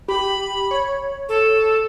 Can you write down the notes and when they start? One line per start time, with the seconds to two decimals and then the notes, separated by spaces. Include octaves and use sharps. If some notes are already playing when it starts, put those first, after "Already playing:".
0.08 G4 B5
0.71 C#5
1.29 A4